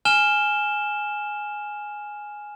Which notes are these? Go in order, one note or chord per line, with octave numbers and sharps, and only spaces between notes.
G#5 F6 E7 G7